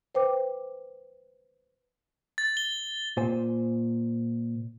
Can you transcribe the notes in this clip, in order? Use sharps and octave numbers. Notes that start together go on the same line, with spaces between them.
B4 C5 G5 D6
A6
G7
A#2 C5 G#5